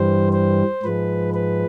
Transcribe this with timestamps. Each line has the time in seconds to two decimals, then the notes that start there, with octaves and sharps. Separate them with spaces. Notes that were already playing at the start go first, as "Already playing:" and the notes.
Already playing: G2 E3 G3 C5
0.33 C5
0.83 G#2 F3 G#3 B4
1.34 B4